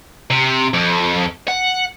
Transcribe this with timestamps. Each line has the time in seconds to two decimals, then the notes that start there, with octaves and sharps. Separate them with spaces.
0.30 C3
0.74 F2
1.48 F#5